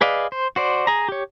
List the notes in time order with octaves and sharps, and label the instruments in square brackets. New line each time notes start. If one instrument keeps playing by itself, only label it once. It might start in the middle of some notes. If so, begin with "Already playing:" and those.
[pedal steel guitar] G#4 B4 D5 D#5 F5
C5
F#4 C5 D5
G#4 A#5
G4 C#5